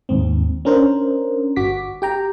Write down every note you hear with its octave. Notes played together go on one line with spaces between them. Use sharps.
D#2 G#2 C4
C#4 D4 A#4 C5
G1 F#4 D6 B6
G4 G5 A#5